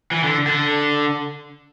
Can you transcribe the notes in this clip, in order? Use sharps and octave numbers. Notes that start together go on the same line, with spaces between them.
E3
D3
D3